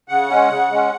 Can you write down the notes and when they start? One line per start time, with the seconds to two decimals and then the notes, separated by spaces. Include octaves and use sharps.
0.08 C#3 F#5
0.29 G#3 C#4
0.50 C#3
0.71 G#3 C#4